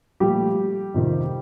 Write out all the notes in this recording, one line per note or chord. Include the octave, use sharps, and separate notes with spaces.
A#2 F3 G3 A3 G4
F2 C3 D#3